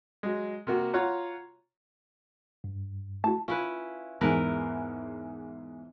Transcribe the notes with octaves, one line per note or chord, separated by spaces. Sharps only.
F#3 G#3
C3 A#3 F#4
F4 C#5 F#5 A#5
G2
A3 E4 F#4 A5
C#4 E4 F4 B4
E2 G#2 E4 A#4 B4